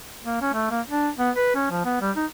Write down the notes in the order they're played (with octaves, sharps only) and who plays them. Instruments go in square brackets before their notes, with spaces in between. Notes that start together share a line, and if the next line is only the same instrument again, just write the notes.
[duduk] A#3
C#4
A3
A#3
D4
B3
B4
C#4
F3
B3
G3
D#4